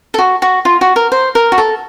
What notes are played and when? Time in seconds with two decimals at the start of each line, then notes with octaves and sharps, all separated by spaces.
0.14 A4
0.18 F#4
0.42 F#4
0.65 F4
0.81 F#4
0.96 A#4
1.12 C5
1.35 A#4
1.52 F#4
1.58 A4